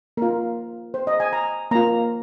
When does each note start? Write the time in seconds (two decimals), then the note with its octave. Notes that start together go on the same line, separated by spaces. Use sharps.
0.17 A#3 F4 A#4
0.94 C5
1.07 D#5
1.20 G#5
1.33 A#5
1.71 A#3 F4 A#5